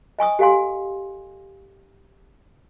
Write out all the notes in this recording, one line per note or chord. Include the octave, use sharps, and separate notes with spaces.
D#5 G#5 C#6 D#6
G4 A4 F5 G#5 C6